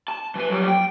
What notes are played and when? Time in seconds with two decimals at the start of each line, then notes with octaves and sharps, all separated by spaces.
0.08 A5
0.35 E3 B4
0.50 F#3 G3
0.68 G5